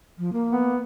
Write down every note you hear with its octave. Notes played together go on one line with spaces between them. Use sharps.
F3
A#3
B3